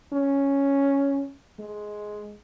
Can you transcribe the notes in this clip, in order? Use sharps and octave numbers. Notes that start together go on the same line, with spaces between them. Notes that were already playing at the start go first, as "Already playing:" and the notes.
C#4
G#3